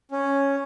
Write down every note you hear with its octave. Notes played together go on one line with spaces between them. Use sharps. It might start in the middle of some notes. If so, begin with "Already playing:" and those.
C#4